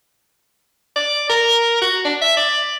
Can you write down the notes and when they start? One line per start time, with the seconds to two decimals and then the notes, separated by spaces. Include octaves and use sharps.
0.96 D5
1.30 A#4
1.82 F#4
2.05 D4
2.21 E5
2.37 D5